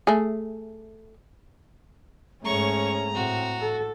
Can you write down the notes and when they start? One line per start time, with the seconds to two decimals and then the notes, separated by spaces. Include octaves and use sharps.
0.07 A3 G#4
2.45 G#2 A3 C#4 G#4 C#5 A#5 C#6
3.15 A2 C4 F#4
3.61 A4